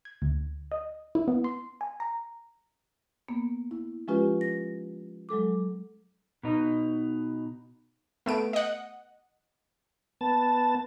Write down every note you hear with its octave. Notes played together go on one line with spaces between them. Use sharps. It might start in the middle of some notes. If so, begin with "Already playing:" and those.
G#6
D2
D#5
E4
B3
C6
G#5
A#5
A#3 B3
E4
F3 G#3 C#4 F4 G4 B4
A#6
F#3 G#3 A4 D6
B2 D#4
A3 B3 D7
D#5 F#5
B3 A5